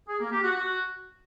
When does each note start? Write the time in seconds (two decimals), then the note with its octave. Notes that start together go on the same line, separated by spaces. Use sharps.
0.08 G#4
0.20 A#3
0.32 G4
0.44 F#4
0.55 F#4